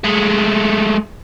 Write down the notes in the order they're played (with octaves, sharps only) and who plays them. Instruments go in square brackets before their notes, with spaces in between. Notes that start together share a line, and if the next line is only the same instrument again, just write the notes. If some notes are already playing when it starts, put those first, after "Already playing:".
[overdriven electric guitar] G#3 A3